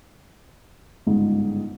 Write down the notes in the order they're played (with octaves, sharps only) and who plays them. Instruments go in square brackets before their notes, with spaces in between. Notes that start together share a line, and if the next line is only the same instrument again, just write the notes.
[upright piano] G1 C#2 G#2